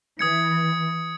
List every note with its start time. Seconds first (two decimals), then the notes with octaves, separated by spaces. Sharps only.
0.19 E3 D#6 G#6 C#7